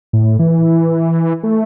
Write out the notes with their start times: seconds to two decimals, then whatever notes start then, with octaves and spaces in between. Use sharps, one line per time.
0.13 A2
0.39 E3
1.43 A3